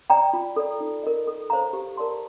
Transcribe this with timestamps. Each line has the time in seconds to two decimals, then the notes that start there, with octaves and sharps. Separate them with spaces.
0.10 D5 G5 A#5
0.33 F4
0.56 A4 D5
0.80 D#4
1.03 A#4 D#5
1.27 A4
1.50 C5 F5 A#5
1.73 G4
1.97 A#4 D5 A5 C6